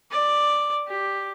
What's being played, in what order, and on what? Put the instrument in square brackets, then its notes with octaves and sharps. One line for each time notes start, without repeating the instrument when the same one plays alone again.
[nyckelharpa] D5
G4